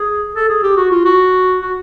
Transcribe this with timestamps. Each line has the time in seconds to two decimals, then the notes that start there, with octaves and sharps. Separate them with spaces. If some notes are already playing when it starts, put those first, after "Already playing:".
Already playing: G#4
0.35 A4
0.49 G#4
0.63 G4
0.77 F#4
0.91 F4
1.05 F#4
1.61 F#4